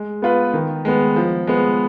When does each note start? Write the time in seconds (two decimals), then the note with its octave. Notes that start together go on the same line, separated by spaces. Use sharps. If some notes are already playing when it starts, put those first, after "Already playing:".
Already playing: G#3
0.22 B3 F4 B4
0.54 D#3
0.85 G#3 B3
1.16 F3
1.47 G#3 B3